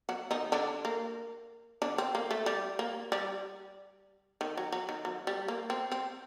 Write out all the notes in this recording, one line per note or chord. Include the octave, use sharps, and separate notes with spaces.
F#3 F#4
D#3 D#4
D3 D4
A#3
D3 D4
C4
A#3
A3
G3
A#3
G3
D#3
F#3
F#3
D#3
F#3
G3
A#3
C4
C4